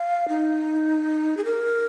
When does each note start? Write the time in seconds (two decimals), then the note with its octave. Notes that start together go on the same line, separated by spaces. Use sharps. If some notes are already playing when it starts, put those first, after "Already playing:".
Already playing: F5
0.29 D#4
1.37 G#4
1.45 A#4